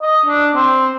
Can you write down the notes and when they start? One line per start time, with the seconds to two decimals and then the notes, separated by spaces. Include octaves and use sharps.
0.02 D#5
0.26 D4
0.56 C4